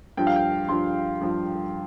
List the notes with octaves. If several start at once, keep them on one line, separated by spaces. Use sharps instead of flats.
G2 F3 G5
F5
G5
G2 F3 C6
G2 F3